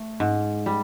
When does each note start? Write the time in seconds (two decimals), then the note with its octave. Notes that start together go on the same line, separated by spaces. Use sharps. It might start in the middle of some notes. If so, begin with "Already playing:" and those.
Already playing: A3
0.20 G#2
0.66 G3